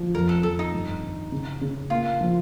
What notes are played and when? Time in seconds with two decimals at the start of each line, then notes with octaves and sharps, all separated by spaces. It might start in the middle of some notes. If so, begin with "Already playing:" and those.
Already playing: F3
0.15 F2 A#4
0.29 A4
0.43 F2 A4
0.59 D#4
0.73 G2
1.03 D#3
1.32 C#3
1.61 C#3
1.90 A#3 F4
2.21 F3